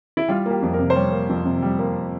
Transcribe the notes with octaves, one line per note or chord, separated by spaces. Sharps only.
E4
G3 F4
A#3 G4
F2
A#4
C3
C5
G3 C#5
A#3
F2
C3
G3
A#3